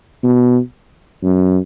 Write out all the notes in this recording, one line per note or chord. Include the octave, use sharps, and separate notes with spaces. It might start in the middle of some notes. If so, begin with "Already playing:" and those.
B2
F#2